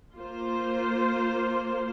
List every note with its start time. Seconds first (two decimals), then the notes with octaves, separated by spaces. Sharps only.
0.16 A#3 F4 C5